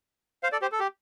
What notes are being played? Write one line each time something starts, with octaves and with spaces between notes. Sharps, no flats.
C5 F5
A4 D5
G4 C5
A4
G4